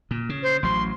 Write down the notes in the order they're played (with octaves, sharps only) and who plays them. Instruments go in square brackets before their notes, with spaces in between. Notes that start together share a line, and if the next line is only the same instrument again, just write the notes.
[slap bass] A#2
C#3
[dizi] C5
[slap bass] A1 F#3 [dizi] C6